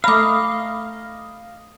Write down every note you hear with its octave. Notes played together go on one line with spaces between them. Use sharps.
A3 D#5 F5 A#5 B5 D6